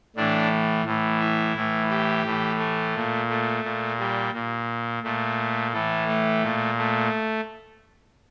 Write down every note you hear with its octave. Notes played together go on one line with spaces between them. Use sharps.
A2 E3 D4
A2 E3
E4
A2 E3
G4
A2 E3
A3
A#2
A3
A#2
G3
A#2
A#2 A3
A2 E3 A3
A3
A#2
A3